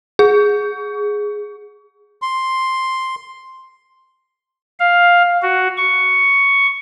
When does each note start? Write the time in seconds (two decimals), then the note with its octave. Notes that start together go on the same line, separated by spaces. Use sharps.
0.19 G#4
2.22 C6
4.80 F5
5.42 F#4
5.77 C#6